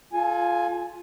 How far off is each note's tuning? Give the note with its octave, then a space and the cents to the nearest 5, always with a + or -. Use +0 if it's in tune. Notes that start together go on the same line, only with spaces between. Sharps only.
F4 +0 A4 -40 G#5 +0